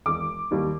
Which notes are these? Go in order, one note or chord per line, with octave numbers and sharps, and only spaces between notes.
E1 D6
D#2 D#3 G3